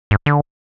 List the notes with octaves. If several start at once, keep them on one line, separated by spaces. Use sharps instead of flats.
G#2
D3